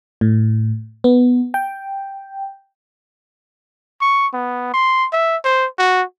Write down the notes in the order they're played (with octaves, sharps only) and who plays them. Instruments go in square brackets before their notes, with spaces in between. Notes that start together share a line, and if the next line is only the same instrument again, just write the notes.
[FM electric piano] A2
B3
G5
[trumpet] C#6
B3
C6
E5
C5
F#4